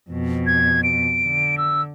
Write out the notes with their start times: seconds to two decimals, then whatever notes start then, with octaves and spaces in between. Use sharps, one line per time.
0.11 F2 B2
0.47 G#6
0.84 D7
1.24 D3
1.58 E6